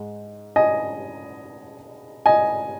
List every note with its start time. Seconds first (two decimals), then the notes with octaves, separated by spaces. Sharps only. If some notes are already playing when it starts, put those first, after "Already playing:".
Already playing: G#2 G#3
0.56 D#5 G#5
2.26 D#5 G#5